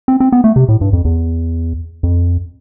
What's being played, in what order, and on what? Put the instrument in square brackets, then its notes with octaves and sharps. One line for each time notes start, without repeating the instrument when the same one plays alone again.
[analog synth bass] C4
C4
B3
A3
C3
A2
G2
F2
E2
F2